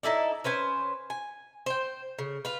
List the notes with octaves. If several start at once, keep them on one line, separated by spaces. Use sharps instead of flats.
D#4 E4 A4 D5
C#4 B4 C5 G#5
G#5
C5 G5
C#3
F4 B4